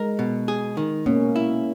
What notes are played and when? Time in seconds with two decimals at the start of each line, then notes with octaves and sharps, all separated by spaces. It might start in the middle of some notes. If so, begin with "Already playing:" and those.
Already playing: G#3 A#4
0.19 B2
0.48 G#4
0.77 D#3
1.06 B2 A#3 C#4
1.36 E4